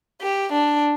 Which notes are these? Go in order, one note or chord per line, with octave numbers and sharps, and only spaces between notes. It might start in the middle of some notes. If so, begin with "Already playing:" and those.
G4
D4